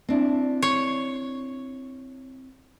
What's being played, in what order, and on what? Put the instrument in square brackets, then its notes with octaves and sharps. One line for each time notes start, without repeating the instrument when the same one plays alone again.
[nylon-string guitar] C4 D4 E4
[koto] C#5